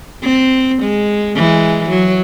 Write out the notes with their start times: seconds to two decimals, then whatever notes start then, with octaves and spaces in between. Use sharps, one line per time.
0.23 C4
0.82 G#3
1.36 E3 G#3
1.89 F#3